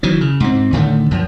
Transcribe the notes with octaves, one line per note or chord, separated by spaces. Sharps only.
D#3 E3 F#3
C#3
G#2 C4
A2 D3 D#3 A3
F#2 F3